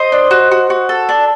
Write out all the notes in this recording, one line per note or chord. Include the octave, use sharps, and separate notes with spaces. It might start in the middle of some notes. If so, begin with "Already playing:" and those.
Already playing: C5 D#5
D4
F#4
F#4
F#4
A4
D4